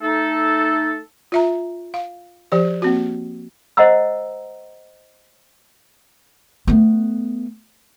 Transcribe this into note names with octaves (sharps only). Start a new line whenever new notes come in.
A3 D#4 A4
F4 E5 A#5
F5
F3 G4 C5
A#3 C4 F#4
C5 D#5 F#5 A#5 E6
A3 B3